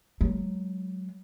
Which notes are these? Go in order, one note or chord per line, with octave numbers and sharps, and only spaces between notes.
F#3 G#3